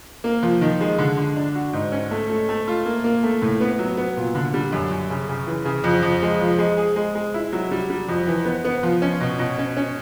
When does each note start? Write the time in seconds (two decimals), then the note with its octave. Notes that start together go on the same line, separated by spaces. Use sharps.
0.24 A#3
0.43 F3
0.61 D#3
0.81 G#3
0.98 D3
1.18 D3
1.37 D4
1.55 F#4
1.73 G#2
1.92 C#4
2.11 A3
2.29 A3
2.49 A3
2.68 F4
2.86 A#3
3.04 A#3
3.23 A3
3.42 A2
3.60 B3
3.79 F#3
3.97 B3
4.17 A#2
4.35 D3
4.54 G3
4.73 F#2
4.91 F#2
5.10 C#3
5.29 C#3
5.47 E3
5.65 C#3
5.84 F2
6.02 F2
6.22 G#3
6.41 F3
6.58 G#3
6.77 G#4
6.96 G#3
7.15 G#3
7.34 E4
7.53 F#3
7.71 G3
7.90 G3
8.08 F2
8.27 E3
8.45 B3
8.65 B3
8.83 F3
9.02 C#4
9.20 B2
9.39 B2
9.58 C#4
9.77 C#4